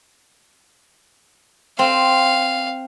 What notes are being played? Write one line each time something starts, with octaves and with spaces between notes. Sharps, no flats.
C4 F5